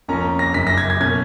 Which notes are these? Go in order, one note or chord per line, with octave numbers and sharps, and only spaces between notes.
F2 F3 A#3 C#4 A#5
A#6
F#1 F#2 C#3 B6
A#6
G#6
G#6
B2 A#3 C#4 G#6